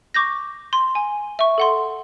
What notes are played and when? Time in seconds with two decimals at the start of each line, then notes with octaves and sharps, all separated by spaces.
0.14 C#6 D6 G6 A#6
0.73 C6
0.95 G#5
1.39 E5 C#6
1.58 A4 F#5 C6